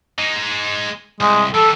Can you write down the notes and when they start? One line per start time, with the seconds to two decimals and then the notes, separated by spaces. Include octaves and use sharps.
0.18 G#3 D#4
1.20 C2 G#3
1.54 E3 G3 A4